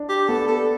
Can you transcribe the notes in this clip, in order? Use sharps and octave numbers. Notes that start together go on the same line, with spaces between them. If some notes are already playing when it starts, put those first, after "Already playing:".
Already playing: D4
G4
B3 A4
A4